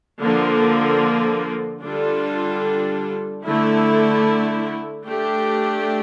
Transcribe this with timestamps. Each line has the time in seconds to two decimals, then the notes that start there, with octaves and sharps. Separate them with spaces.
0.20 D3 F3 A#3
1.82 D3 G3 D4 F4 A4
3.44 D3 A3 E4
5.06 A3 D4 G4